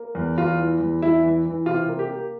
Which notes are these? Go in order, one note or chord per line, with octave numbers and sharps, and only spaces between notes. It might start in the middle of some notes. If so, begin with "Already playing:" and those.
Already playing: A#3
E2
E2 F4
E3
E2
E2 E4
E3
E3
C3 F4
A#3
G4
A#3